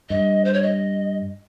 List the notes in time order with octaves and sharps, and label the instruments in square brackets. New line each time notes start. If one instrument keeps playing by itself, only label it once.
[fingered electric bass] G2 [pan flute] D#5
[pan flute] C5
C#5
D#5